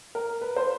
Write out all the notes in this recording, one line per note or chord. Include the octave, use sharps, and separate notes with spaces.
A#4
B4
C5